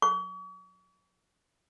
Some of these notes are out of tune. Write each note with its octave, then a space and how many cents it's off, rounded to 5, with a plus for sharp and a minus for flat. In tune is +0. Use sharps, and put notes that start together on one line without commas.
C#6 +45